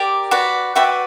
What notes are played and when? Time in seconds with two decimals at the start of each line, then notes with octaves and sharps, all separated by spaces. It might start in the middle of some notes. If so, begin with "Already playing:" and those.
Already playing: G4 A#4 D5
0.31 F#4 B4 D5
0.75 F#4 B4 D5 E5 G5